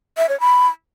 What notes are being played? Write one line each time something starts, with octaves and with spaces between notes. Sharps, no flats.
E5
C#5
B5